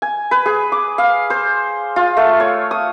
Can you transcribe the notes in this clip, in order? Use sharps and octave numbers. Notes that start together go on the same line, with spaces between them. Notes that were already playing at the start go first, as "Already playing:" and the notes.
G#5
B4
G#4
D6
F5
C5
F4
A3
C#5
D#6